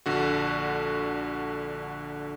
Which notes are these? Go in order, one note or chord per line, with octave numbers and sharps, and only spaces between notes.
A#1 D3 F#4